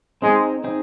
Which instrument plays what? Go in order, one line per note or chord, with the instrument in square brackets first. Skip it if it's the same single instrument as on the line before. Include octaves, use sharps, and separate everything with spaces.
[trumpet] G#3 [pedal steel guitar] C4 D#4 G#4
[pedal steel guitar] C4 D#4 G#4